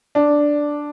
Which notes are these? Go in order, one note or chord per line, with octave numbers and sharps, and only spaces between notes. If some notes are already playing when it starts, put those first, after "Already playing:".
D4